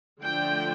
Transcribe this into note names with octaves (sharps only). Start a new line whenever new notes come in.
D3 F3 A3 D4 G5